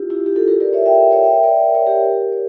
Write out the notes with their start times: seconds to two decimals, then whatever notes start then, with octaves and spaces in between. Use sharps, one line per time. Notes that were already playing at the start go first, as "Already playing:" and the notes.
Already playing: E4 F4 G4
0.10 E4 G4
0.26 G4
0.36 F4 A4
0.48 G4 A#4
0.60 A#4 D5
0.73 C#5 E5
0.86 E5 G5
1.11 C#5 E5
1.24 E5 G5
1.43 A#4 D5
1.63 A#4
1.75 C#5
1.86 G4 A#4
2.32 C#5